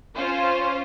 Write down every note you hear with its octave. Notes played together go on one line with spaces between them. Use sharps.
C#4 F4 C5